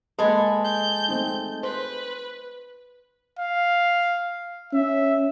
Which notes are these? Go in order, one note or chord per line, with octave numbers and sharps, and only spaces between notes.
G#3 A#3 A4 B4 G#5
G6
A3 C4 D#4
B4 C5
F5
C#4 E5